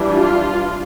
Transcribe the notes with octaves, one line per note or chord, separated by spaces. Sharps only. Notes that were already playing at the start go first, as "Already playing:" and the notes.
Already playing: E3 G3 D4
F4